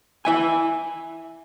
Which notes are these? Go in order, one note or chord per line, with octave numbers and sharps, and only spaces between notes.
E4 E5 G#5